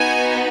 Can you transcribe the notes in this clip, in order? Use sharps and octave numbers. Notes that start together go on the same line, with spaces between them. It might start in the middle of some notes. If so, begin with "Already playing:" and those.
Already playing: B3 D#4 F#4 G#5